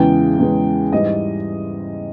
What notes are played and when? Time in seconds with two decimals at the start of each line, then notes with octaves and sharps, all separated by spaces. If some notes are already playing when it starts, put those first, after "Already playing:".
Already playing: E2 C#3 E3 G#3 G5
0.39 E2 C#3 E3 G#3
0.92 G#2 E3 G3 D#5